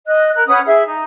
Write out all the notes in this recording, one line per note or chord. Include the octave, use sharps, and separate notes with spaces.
D#5 F#6
A#4 F#6
C#4 B4 F#5 D#6
E4 G#4 E5
D#4